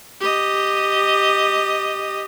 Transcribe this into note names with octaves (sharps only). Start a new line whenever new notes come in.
G4 D#5